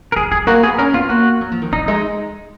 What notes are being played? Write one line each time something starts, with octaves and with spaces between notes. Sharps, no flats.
A#4
D#3 G#4
F#3 G#4
A#3 F#4
B3 G#4
C#4 A#4
B3 F4
A#3 F#4
F#3
F3
D#3
F3 D#4
G#3 D#4